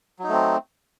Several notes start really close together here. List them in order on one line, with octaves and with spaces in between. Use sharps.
F#3 D#4 A3 C4